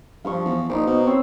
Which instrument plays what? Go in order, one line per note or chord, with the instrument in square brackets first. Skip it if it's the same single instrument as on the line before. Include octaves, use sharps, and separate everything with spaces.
[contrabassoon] G2 [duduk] F3 [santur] F5 C#6
[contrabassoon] E2
[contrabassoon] A#1 [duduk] D#4 [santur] C5 D6
[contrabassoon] B2
[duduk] C4 [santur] C#5 E6